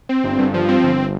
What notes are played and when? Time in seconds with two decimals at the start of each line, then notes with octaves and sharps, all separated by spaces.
0.09 C4
0.24 G1
0.38 G2
0.54 F3
0.68 C4
0.84 G1